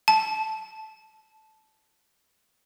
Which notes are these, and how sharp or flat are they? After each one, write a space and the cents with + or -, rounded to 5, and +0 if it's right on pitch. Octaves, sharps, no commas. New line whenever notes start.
A5 -10